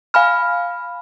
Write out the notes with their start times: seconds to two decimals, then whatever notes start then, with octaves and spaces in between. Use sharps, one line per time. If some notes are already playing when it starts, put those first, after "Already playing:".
0.14 F5 G#5 B5 F6